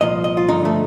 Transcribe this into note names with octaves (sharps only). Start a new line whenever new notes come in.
C2 A#2 F3 D#5
D#5
F4
G2 D3 F3 D#4
A3